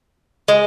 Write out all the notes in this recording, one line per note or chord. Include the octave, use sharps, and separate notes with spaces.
G#3